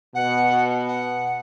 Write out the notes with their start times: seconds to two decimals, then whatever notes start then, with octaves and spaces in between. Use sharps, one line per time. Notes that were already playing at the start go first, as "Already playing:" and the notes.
0.15 B2 F#5
0.88 F#5